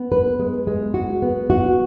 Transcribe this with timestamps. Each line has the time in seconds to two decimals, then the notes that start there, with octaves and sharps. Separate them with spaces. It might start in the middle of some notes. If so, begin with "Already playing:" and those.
Already playing: B3
0.12 B4
0.39 G#3
0.67 G#3
0.94 F#4
1.22 B3
1.50 F#4